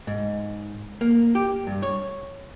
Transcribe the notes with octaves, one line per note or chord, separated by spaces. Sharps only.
G#2
A#3
G4
G2
C#5